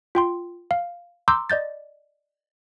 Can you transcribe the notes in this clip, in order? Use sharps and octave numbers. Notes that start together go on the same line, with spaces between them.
F4 G5 C6
F5
A#5 C6 D6 E6 G6
D5 D#5 G6 A6